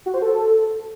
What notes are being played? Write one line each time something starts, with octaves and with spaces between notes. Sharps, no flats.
F#4
C5
A4